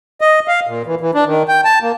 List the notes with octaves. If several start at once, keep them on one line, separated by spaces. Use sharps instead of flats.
D#5
F5
A#2
E3
E3
D4
D#3
G5
A5
A#3